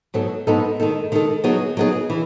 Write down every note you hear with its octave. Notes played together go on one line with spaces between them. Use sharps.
G#2 F#3 B3 D#4 A4
G#2 F#3 B3 D#4 A4
D#3 G#3 D#4 A4
D#3 G#3 D#4 A4
F#3 B3 D#4 G#4
F#3 B3 D#4 G#4
E3